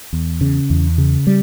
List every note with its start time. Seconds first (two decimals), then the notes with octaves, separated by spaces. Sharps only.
0.13 E2
0.41 C#3
0.70 E2
0.98 C#3
1.27 G3